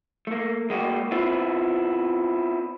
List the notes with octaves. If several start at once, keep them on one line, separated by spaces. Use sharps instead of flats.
A3 A#3
G#3 A#3 F#4 G4
B3 C4 E4 F4